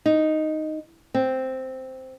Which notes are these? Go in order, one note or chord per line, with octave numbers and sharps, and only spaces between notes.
D#4
C4